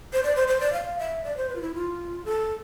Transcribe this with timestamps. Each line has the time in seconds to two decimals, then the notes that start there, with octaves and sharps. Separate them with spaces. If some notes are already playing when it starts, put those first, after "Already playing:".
0.13 C5
0.23 D5
0.36 C5
0.48 C5
0.60 D5
0.73 F5
0.99 E5
1.24 D5
1.37 C5
1.49 B4
1.55 F4
1.62 E4
1.75 F4
2.25 A4